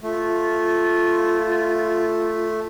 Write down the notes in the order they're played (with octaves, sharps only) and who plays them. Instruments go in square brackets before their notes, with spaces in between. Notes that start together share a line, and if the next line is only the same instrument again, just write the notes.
[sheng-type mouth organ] A3 [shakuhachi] F4